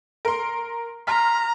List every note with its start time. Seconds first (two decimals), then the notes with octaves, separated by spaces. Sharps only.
0.25 A#4 C6
1.07 A#5 C6 F6 B6